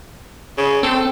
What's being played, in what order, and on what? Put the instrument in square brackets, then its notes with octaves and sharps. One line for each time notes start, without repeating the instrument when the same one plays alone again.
[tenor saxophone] C#3
[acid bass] C4 [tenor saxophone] A4